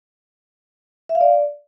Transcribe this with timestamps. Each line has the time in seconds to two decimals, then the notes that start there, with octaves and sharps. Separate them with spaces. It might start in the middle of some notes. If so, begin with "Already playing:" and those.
1.09 E5
1.15 F5
1.21 D5